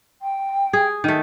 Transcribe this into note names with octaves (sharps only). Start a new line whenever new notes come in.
G5
G#4
D#3 A3